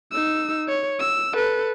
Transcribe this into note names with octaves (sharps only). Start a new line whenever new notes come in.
D#4 E6
C#5
E6
A4 B4